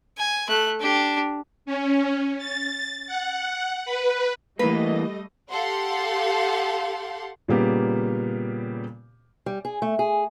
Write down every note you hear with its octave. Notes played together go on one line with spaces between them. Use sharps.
G#5
A3 F#6
D4 G4
C#4
A6
F#5
B4
E3 G3 A3 A#3 B4 D#5
G4 A4 F5 F#5 C6
A#2 C#3 G3 A#3 B3 G4
G3
G#4
A3
G#4